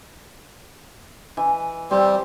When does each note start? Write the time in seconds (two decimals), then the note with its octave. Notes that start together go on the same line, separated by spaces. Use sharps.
1.37 E3
1.91 G3 C4